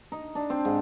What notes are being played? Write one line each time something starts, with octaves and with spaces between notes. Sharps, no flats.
D#4
D4
C4
G#2